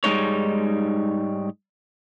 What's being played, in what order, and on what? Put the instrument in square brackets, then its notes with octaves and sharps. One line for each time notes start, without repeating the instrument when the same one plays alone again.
[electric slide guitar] G#2 G3 G#3 B3 D#4 C#5